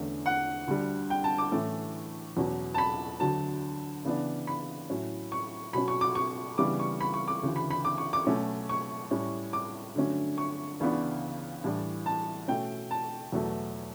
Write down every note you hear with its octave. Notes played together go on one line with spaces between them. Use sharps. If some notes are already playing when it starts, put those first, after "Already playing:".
Already playing: E2 D3 A3 C#4
F#5
D2 D3 G3
G5
A5
D6
A2 E3 A3 C#4
E2 B2 F#3 C#4
A5
B5
D2 D3 F#3 A5
C#3 E3 B3 D4
B5
A2 F#3 C#4
C#6
B2 F#3 C#4 B5
C#6
D6
C#6
C#3 E3 G3 B3 D4 D6
C#6
B5
C#6
D6
D2 C#3 E3
B5
B5
D6
C#6
D6
B2 F#3 A3 C#4
C#6
A2 G3 C#4
D6
G2 D3 F#3 A3 C#4
C#6
C#2 C#3 E3 B3 D4
A2 E3 G3 D4
A5
B2 A3 C#4 G5
A5
E2 B2 F#3 A3